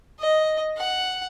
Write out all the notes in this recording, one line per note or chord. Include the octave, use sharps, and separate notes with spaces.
D#5
F#5